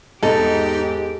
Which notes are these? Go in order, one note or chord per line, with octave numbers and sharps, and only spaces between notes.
E2 G#2 D#4 G4 A4